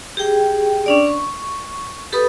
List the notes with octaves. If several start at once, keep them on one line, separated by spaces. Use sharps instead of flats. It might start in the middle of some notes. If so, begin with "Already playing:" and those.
G4 G#4 G5
C#4 D4 D5
C#6
G4 A4 B4 B5 D#6